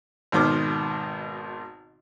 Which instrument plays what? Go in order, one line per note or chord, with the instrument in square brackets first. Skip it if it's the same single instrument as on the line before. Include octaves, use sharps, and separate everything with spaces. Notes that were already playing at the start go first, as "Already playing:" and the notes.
[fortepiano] G#1 B2 D#3 C5 D6 F6